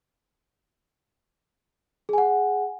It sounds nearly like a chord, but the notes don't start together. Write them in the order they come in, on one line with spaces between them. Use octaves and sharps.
G#4 G#5 F#5